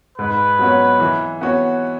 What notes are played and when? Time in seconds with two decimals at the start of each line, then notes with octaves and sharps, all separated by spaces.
0.18 G#2 B4
0.59 F#3 B3 F#4 C#5
1.00 E3
1.41 B3 F#4 C#5